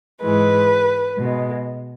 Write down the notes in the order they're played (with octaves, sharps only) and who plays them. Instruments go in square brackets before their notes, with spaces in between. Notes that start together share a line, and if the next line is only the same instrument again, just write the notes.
[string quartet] G#2 E3 G#3 B4
B2 G#3